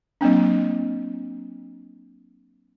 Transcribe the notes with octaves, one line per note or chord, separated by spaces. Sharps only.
F#3 A#3 C4 D4